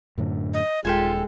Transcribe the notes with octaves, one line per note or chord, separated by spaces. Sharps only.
F#2 A2 D3
D#5
D#1 G#3 F4 G4 A4 G#5